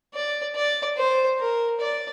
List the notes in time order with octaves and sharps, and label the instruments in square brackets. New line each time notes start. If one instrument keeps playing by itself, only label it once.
[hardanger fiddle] D5
D5
C5
A#4
D5